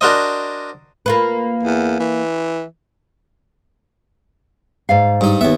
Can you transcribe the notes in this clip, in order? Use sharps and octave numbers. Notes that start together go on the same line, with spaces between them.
D4 F#4 A#4 C5 D#5
A#3 F4 B4
E2
E3
G#2 D5 F5
G2 D#4
D#2 B3 E5